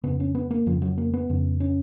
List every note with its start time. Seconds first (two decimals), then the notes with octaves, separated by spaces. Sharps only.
0.04 F2 C#3 B3
0.20 C#4
0.35 B3
0.51 A#3
0.66 F2 C#3 F3
0.82 F#3
0.98 A#3
1.14 B3
1.29 F2 C#3
1.60 C#4